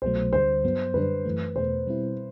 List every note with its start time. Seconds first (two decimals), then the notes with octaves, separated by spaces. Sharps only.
0.02 C2 B2 F#3 A3 C5
0.33 D2 D3 G3 C5
0.64 G2 F#3 B3
0.94 F#2 D3 G3 D4 B4
1.25 F#2 E3 A3
1.56 E2 B2 A3 C5
1.87 B2 G3 C4 E4